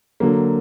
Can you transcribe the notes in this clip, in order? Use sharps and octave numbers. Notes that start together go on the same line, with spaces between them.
D3 F#3 A#3